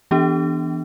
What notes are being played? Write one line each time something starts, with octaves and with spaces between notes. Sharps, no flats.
E3 B3 D4 G4